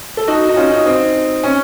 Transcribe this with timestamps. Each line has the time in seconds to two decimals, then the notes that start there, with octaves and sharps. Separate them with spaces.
0.17 A4
0.28 D#4 F#4
0.49 D#4
0.56 C#4 F4
0.71 D#4 F#4
0.86 C4 D#4
1.44 C#4